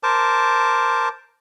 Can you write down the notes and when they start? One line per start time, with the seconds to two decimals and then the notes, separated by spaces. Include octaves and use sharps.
0.03 A#4 C5 A5 D6